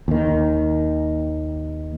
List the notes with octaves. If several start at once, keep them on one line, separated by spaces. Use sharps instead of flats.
D#2 D#3